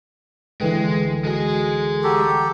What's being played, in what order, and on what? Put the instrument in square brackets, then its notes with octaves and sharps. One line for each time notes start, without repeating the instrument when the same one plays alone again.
[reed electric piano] C#2 D3 E3 [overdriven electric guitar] G#3 [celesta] A4 B4 G5
[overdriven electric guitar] G#3 G#4 [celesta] F#4 A4
[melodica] G4 A4 [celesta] F#5 A#5 C#6